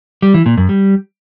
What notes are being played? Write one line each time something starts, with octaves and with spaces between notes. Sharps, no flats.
G3
E3
A#2
F#2
G3